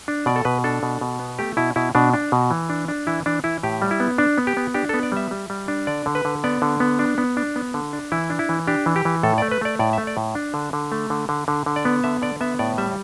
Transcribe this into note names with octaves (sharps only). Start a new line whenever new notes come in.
D4
B2 D5
A4
B2 B4
D4 A4
B2
B2
B3
A3 G4
B2 E4
B2 E4
B2 D4
D4
B2
E3
D4
D4
E3 E4
E3 D4
E3 E4
A2 G4
G3
E4
B3
D4
B3
G4
B3
D4 G4
B3 A4
D5
G3 E5
G3
G3
D4
D3 D5
D3
B4
D3
B3 D5
D3
B3
D4
B3
D4
B3
D3
D4
E3 E4
D4
E4
E3
D4 G4
E3
G4
E3
A2 A4
A3 D5
B4
A3 D5
A2 D5
A3 E5
D5
A2
D4
D3
D3
A3
D3
D3
D3
D3
D5
B3
D3 E5
D3 D5
B3 E5
A2 D5
G3 E5